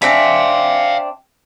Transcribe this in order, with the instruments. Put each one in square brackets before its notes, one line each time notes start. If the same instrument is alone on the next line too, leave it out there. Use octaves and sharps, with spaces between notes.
[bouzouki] C4 D4 E5 [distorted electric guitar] F5 G#5